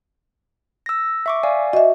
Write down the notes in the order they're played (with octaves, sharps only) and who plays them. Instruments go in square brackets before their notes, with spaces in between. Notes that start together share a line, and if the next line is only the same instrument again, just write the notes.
[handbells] E6 A#6
E5 C#6 D6
D5 F5 G#5
[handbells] F#4 [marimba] D#5 E5